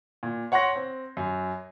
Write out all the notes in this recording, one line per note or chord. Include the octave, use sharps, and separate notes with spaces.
A#2
C#5 F#5 C6 C#6 A#6
C4
F#2